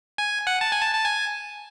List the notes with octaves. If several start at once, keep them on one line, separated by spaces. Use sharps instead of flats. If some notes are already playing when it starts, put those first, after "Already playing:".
G#5
F#5
A5
G#5
A5
A5
G#5